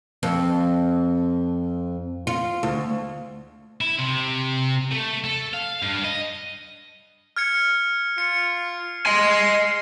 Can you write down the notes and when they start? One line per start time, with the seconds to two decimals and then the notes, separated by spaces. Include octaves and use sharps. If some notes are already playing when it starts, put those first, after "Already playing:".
0.23 F2
2.27 F4
2.63 D2
3.81 E4
3.99 C3
4.91 A3
5.24 A4
5.53 F5
5.82 G2
6.04 D#5
7.36 F6 G#6 C#7
8.18 F4 C#7
9.06 D#5 G#5 C6